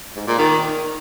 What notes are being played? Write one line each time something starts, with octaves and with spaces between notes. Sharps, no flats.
G#2
A#2
D#3